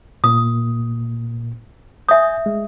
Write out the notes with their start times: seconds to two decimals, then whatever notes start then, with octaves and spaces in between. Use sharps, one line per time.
0.24 A#2 A#3 D#6
2.09 E5 G#5 D#6 G6
2.46 G#3